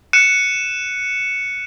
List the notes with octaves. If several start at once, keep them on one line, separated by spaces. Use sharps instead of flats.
F#6 C#7 D#7 E7